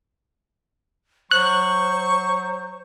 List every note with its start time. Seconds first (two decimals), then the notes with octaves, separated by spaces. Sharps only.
1.31 F#3 C5 C#6 F#6